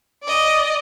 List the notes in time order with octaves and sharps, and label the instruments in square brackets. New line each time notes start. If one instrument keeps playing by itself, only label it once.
[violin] D5 D#5